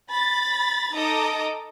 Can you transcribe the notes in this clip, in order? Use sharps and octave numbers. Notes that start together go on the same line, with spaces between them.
B5 A6
D#4 A4 D#5 A#5 D6 D#6